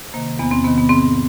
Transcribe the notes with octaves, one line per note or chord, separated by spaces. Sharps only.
C3 D#3 A#3
E2 B3
C4
C3 D#3 B3
B3
G#2 C4